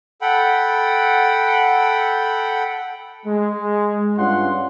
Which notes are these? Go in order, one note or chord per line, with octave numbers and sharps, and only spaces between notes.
A4 F#5 G5 B5
G#3
G2 C#4 F4 F#5 C6